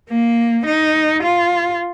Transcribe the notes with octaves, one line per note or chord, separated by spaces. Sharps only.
A#3
D#4
F4